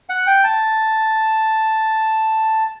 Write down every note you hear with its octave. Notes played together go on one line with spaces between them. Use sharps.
F#5
G5
A5